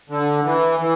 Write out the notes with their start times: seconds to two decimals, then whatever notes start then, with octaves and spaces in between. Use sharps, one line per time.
0.09 D3
0.45 E3
0.80 E3